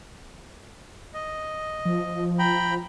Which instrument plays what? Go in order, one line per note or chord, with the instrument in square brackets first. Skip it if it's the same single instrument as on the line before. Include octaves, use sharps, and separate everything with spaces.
[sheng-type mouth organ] D#5
[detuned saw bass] F3
[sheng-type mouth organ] G5 A#5 B5